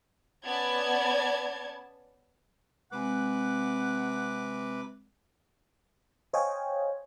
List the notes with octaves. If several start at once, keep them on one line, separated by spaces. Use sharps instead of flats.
B3 C#4 D5 A5 G#6
C3 G#3 C4 B4 F#5 G#5 D6
C5 C#5 D#5 F5 G5 G#5